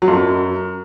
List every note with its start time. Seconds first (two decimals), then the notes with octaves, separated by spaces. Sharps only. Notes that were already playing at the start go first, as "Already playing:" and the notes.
0.02 F#3
0.08 F2
0.13 F#2